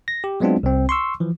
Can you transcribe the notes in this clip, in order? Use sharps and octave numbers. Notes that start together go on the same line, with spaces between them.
A#6
G4
F#3 G#3 B3 C4 D4 F4
C2 C4
C6 C#6 E6
E3 F3